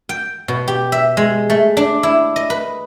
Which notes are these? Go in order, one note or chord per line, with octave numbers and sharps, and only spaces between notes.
G5
B2
G4
E5
G#3
A3
D4
E4
D#5
B4